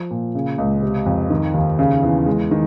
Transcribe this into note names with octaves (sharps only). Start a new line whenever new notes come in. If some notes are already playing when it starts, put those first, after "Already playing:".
Already playing: F3
A#2
C#3
C#2
C3
F2
D#3
D#2
C#3
E2
G#3
D#3